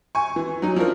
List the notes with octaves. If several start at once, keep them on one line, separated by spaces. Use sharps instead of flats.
G#5 C#6
E3
F#3 D#4
F3 D4 A#4